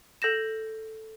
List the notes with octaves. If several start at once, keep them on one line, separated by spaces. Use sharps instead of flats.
A4 G6 A#6 E7